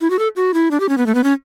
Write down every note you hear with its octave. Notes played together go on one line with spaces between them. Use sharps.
E4
F#4
A4
F#4
E4
D4
G4
C#4
B3
A3
B3
C#4